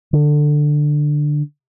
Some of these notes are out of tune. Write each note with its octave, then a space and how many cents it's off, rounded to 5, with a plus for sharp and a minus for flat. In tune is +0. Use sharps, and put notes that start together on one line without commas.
D3 +10